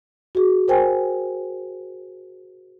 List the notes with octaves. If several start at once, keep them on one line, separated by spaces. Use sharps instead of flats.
F#4 G#4
A#4 C5 G5 G#5